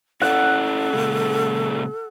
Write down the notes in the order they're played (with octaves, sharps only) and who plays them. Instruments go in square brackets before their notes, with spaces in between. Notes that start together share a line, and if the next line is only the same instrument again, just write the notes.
[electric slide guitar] C#4 E4 D5 [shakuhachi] A4 [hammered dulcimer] F#5
[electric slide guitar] A#2 C#3 G#3